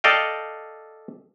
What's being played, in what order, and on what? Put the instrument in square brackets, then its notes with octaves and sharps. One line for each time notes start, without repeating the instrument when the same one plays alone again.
[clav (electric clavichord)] A4 D5 D#5 F5 G5